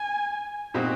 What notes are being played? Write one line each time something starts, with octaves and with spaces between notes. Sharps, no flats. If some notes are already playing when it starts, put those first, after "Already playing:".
Already playing: G#5
A#2 G3 C4 D#4 F#4